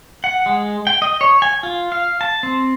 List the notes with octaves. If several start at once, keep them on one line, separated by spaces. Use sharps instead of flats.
F#5
G#3
G5
D#5
C#5
G#5
F4
F5
A5
C4